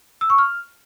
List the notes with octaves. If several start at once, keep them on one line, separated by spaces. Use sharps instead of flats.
E6
C#6
F6